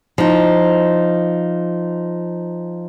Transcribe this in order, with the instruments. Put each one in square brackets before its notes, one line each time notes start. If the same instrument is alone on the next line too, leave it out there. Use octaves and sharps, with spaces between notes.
[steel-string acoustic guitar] F3 D#4